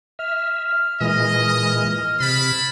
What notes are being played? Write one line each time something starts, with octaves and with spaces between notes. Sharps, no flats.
E5 F6
A#2 E3 G#3 D#5
C3 E4 A5 B5